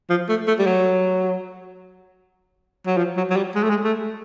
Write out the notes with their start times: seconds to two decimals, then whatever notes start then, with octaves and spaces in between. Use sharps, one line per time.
0.10 F3
0.29 A3
0.47 A3
0.59 G3
0.66 F#3
2.87 F#3
2.97 F3
3.17 F#3
3.30 F#3
3.36 G3
3.55 G#3
3.63 A3
3.70 G#3
3.84 A3